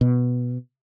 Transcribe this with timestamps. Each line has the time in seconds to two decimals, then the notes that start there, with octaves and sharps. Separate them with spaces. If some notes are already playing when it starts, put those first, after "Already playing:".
0.01 B2